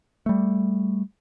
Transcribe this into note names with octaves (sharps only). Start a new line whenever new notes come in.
G3 A3